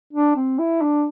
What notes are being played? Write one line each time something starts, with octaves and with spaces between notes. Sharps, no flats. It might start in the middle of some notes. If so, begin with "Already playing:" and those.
D4
C4
E4
D4